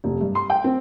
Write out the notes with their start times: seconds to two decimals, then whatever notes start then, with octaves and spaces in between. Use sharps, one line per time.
0.04 F1
0.21 G2
0.35 C6
0.50 G5
0.64 C4